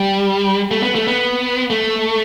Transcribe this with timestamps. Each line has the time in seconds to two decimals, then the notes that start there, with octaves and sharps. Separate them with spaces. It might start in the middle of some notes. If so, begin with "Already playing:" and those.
Already playing: G3
0.71 A3
0.83 B3
0.95 A3
1.08 B3
1.70 A3